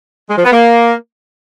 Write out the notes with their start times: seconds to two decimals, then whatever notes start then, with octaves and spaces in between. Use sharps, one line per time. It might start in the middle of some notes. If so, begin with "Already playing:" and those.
0.30 G#3
0.37 F3
0.45 B3
0.52 A#3